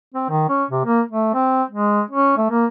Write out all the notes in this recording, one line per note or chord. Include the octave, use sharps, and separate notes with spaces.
C4
D#3
C#4
C3
A#3
A3
C4
G#3
C#4
A3
A#3